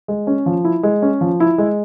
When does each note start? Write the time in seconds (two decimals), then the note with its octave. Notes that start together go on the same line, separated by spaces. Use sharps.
0.08 G#3
0.27 C#4
0.46 F3
0.65 E4
0.83 G#3
1.02 C#4
1.21 F3
1.40 E4
1.58 G#3